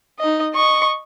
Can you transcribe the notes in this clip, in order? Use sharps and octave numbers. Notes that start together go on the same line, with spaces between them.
D#4 D#5
D#5 C#6